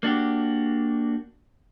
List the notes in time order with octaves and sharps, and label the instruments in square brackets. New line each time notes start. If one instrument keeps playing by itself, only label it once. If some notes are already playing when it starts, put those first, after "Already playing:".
[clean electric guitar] A#3 D4 F#4 G4